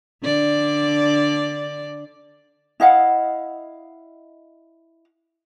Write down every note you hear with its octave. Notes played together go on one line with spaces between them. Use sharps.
D3 D4 D5
E4 D#5 F5 F#5